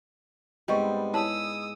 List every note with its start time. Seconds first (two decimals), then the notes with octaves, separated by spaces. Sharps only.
0.68 G#2 G3 B3 C4 D5 D#5 C#6
1.14 E4 G#4 C#5 A5 B5 D#6 E6